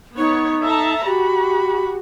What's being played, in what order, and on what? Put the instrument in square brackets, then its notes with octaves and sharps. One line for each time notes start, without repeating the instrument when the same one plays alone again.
[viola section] B3 C#5 [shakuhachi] D#4
[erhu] A4 [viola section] E5 A5 A#5
[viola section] F#4 [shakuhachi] G4 [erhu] B5